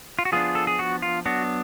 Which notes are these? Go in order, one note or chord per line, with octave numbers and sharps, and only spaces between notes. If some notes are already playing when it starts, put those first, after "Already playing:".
F4
F#4
F3 B3 D4 F4 G#4
A4
G#4
F#4
F4
F#3 B3 D4 F#4